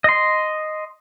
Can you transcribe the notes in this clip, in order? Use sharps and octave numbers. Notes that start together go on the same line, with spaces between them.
D#5 C6